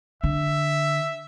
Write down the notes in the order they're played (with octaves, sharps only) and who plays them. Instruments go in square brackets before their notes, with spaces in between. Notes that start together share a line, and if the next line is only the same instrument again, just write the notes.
[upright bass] D3 [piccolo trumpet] E5